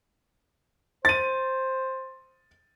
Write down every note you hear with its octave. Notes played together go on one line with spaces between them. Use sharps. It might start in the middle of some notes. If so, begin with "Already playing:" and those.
C5 A6 D#7